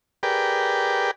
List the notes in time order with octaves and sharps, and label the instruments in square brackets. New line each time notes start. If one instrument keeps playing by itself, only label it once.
[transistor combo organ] G4 G#4 A#4 B4 D5 G5